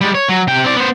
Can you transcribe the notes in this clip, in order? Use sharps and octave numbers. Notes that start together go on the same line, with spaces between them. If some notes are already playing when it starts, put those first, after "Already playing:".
G3 G#3
C#5
F#3
C3 G5
C4 D5
B3 C5